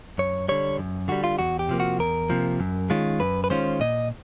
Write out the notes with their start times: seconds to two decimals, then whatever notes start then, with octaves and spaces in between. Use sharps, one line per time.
0.18 F#2 C#5
0.48 D3 G3 C#5
0.78 F#2
1.08 D3 G3 F#4
1.24 F4
1.39 E2 F#4
1.59 G4
1.69 C3 F3 A#3
1.80 F#4
1.99 E2 A#4
2.29 C3 F3 A#3
2.60 F#2
2.90 D#3 G#3 C#4 F4
3.20 F#2 B4
3.44 B4
3.50 D#3 G#3 C#4 F4 C5
3.80 A#2 D#5